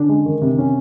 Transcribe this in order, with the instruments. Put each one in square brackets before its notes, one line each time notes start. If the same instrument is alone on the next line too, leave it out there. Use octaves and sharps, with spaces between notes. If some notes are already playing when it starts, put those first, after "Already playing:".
Already playing: [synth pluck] D3 D4 [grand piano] C#4
[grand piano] G#3
D#3
C3
C#4